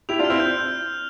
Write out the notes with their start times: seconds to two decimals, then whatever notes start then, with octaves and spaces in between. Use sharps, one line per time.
0.09 E4 G4 F7
0.19 D4 F4
0.24 F6
0.30 C4 E4
0.40 G6